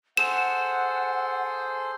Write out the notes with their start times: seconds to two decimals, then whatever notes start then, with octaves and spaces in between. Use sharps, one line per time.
0.17 G#4 A4 C5 F#5 E7